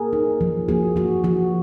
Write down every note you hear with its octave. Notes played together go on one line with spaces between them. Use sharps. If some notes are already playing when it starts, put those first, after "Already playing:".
Already playing: A#3 G#4 A#4
D#4
F3
A#3 F#4 G#4
F3 F#4
F3 F#4